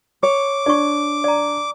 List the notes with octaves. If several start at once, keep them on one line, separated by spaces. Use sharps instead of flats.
C#5 D6
D4 D5 C#6
D5 A#5